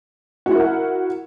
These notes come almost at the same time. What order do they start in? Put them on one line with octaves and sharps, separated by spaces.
F#4 E4 A#4 F#5